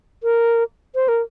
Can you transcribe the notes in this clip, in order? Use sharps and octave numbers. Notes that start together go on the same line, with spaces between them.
A#4
C5
A#4